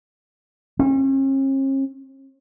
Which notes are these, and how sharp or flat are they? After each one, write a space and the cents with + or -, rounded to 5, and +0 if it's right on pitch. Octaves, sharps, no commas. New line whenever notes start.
C#4 -45